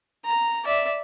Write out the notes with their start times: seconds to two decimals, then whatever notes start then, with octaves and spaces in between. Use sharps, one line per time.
0.25 A#5
0.64 D5 E5